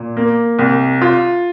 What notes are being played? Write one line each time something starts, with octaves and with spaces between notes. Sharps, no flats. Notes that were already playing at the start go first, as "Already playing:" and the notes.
Already playing: A#2
A#3
C2
F4